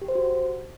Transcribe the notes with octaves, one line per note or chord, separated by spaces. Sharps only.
G4
C5
F#4